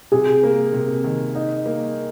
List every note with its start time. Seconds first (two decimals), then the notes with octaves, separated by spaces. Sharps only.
0.12 C3 G#4
0.43 A#3
0.73 C3
1.04 D#3
1.35 D#4
1.66 A#3